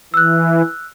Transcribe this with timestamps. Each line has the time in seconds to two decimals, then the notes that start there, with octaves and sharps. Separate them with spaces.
0.14 E3 E6 F#6